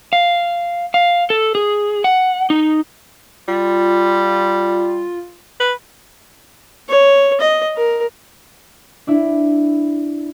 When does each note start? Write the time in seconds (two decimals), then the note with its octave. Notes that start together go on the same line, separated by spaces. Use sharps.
0.13 F5
0.94 F5
1.30 A4
1.55 G#4
2.04 F#5
2.50 D#4
3.48 G3 F4
5.60 B4
6.89 C#5
7.40 D#5
7.76 A#4
9.07 D4 E4